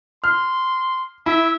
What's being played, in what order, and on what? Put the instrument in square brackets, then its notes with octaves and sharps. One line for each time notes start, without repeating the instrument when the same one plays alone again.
[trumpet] C6 [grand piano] F6
[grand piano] E4 [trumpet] E5